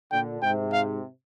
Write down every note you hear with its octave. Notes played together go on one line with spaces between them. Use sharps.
A#2 D3 G5
G#2 C3 G5
F5